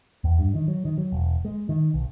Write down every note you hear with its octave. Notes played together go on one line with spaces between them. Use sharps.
E2
G2
D#3
F#3
D#3
F#3
E1
G#3
D#3
B1